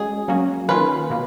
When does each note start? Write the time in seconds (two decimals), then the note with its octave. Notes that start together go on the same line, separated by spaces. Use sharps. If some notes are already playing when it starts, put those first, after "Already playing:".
Already playing: G#3 C#4 F#4 G#4
0.28 F#3 A#3 C#4 F#4
0.69 D#3 A#3 C#4 F4 B4
1.10 B2 A#3